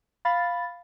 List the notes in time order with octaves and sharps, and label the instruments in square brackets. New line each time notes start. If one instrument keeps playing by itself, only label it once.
[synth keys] F5 B5 A6